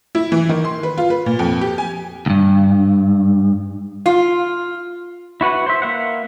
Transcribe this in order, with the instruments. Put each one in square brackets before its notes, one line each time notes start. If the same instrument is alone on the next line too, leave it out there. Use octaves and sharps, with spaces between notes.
[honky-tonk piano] E4
E3
D#3
C6
B4
F4
B4
A#2
F2
G4
G#5
[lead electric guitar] D2 G2
[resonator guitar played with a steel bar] F4
[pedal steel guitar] E4 F#4 B4 F#5
C5 E5
A#3 E5 F#5